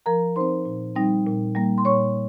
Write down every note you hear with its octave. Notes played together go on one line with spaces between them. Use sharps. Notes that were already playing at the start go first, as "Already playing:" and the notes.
F3 A#4 A#5
C4 D#4 C5 C6
A#2
G3 C4 D#4
A#2
G3 A#3
C6
A#2 C#5 C#6